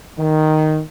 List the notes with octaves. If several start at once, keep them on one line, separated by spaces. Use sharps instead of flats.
D#3